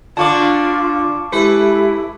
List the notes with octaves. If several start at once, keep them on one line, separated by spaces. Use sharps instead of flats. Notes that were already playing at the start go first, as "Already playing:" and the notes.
D3 D4 F4 A5 C#6 D6
G#3 E4 G4 A4 B4